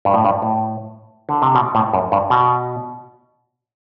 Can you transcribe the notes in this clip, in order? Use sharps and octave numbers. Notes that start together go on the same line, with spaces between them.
G2
A2
G2
A2
D3
C3
B2
A2
F#2
G2
B2